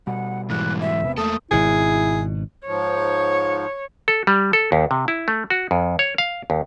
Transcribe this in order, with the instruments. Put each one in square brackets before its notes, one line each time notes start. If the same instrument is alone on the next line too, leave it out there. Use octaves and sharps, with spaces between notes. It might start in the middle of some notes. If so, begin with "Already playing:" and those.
[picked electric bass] B2 G3 [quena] F#5
[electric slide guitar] G#2 E3 [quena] F#6
[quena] E5
[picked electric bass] E1 C3 B3
[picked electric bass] E2 A3 [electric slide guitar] A#3 A4 [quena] D#6
[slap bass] G#1 B2 [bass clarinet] E4 [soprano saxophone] G#4
[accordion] G#2 F3 [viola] C#5
[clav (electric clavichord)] A4
G3
A4
D#2
C3
E4
A3
F#4
F2
C#5
F5
D#2